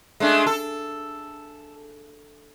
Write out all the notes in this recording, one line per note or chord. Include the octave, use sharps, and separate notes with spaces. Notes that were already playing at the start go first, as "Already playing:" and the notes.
G#3 A3 D4
A4